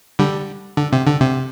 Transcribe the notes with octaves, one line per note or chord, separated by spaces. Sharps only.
D3 G3
D3
C3
D3
C3